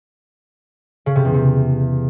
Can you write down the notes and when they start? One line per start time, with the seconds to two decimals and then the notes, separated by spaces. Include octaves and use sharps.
1.06 C#3
1.16 C3
1.25 E2
1.34 C3